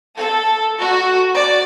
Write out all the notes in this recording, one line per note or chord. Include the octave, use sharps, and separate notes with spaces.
A4
F#4
D5